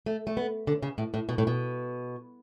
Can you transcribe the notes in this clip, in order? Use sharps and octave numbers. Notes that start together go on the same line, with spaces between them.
A3
A3
B3
D3
C#3
A2
A2
B2
A2
B2